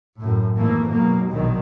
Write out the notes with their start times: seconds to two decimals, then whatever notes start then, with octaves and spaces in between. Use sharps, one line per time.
0.20 F#2 A2
0.57 G#1 G#2 E3 A3 A#3
0.90 G#2 B2 F#3 A#3
1.30 A#1 B2 D#3 F#3